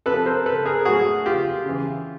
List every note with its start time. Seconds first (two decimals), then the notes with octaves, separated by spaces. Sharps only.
0.06 C3 F3 A4 B4
0.26 A#4 C5
0.46 A4 B4
0.66 G#4 A#4
0.85 A2 F#3 F#4 G#4
1.26 F4 G4
1.66 C#3 E3